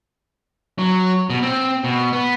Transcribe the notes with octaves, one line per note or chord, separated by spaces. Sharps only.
F#3
B2
C4
B2
B3